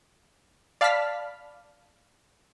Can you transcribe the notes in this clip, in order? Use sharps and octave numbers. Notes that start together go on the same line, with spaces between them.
D5 F5 A5 B5 F6 B6